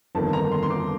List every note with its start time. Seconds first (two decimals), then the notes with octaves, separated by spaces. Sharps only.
0.15 G1 F2 D#3 A#3 A5
0.33 A#5
0.52 C6
0.63 C6
0.70 D6